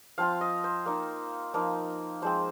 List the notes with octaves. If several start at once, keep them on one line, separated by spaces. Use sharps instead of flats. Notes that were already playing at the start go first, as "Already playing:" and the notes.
F3 C4 F4 F5
D#5
C5
A#3 D#4
F3 A#3 D#4
F3 G#3 C4 C5